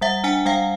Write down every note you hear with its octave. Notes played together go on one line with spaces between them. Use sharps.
G3 E5 F#5
D4 F#5 G#5
G3 F5 G5